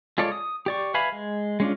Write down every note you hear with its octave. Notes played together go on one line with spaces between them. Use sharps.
G#3 F4 A4 C#5 D5
D#6
G4 D5 C#6
B4 E5 F5 G#5 B5
G#3
G#3 C#4 D4 F4